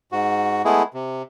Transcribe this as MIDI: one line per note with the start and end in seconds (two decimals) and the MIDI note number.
0.12 0.62 44
0.12 0.62 66
0.65 0.83 56
0.65 0.83 57
0.65 0.83 59
0.65 0.83 64
0.65 0.83 68
0.94 1.22 48